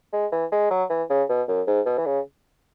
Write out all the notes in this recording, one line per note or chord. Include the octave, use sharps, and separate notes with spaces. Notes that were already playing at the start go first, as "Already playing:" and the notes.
G#3
E3
G#3
F#3
E3
C#3
B2
F#2
G#2
B2
E3
C#3